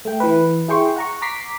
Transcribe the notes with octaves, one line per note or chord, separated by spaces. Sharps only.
A3 G5
E3 B4
E4 G#4 G5 C6 C#6
F#5 A#5 C#6
A#5 D6 B6 C7